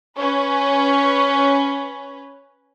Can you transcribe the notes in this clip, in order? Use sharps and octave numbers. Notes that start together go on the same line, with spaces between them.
C#4 B4